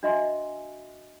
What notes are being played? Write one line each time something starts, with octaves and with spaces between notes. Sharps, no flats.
D4 F#4 D#5 E5 G#5 C6